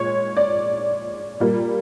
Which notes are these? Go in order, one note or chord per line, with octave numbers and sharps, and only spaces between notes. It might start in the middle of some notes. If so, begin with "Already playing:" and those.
Already playing: A#2 G#3 C#5
D5
A#2 G3 A#3